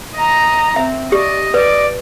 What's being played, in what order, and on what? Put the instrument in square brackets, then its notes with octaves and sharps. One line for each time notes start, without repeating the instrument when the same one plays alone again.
[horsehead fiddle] D#5 A#5
[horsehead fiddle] C4 [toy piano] E5
[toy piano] G4 [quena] D5 [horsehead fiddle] D#5
[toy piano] B4 [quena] D5